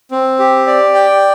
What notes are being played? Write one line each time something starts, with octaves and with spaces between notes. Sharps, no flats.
C4
G4
D5
G5